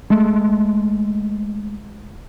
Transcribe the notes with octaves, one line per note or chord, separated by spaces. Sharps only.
G#3 A3